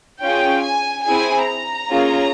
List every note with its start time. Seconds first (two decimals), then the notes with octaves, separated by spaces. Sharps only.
0.21 C#4 F4 G#4 G5
0.64 G#5
1.05 C4 E4 G#4 G#5
1.47 A#5
1.89 A#3 C#4 F4 G#4